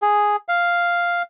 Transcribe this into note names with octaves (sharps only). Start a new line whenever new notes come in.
G#4
F5